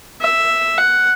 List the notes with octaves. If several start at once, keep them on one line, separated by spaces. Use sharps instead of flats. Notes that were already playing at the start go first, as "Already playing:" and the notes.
E5
F#5